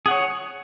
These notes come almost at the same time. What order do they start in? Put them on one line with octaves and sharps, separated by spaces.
G#4 F#5 C#5